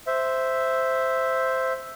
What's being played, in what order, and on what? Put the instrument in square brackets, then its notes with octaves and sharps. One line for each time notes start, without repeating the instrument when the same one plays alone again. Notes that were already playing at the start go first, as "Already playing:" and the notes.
[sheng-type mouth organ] C5 E5